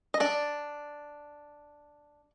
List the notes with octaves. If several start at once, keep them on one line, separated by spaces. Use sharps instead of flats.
D#5
D4 D5